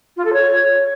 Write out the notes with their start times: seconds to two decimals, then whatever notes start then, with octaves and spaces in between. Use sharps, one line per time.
0.16 F4
0.24 A4
0.33 C#5